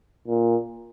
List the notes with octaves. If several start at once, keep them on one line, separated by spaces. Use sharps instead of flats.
A#2